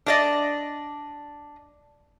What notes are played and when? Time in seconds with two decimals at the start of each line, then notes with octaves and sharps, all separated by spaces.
0.06 D4 D5 D#5